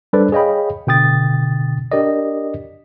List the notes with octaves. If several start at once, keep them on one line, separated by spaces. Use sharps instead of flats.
G3 D4 A4 B4 C5 D5
G#4 C#5 D#5 F5 G5 B5
B2 D3 G5 D#6 A6
D4 G4 A#4 D5 D#5